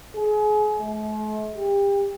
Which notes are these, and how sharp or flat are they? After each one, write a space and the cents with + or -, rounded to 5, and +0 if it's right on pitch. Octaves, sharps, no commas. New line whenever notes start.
G#4 +30
A3 -45
G4 +30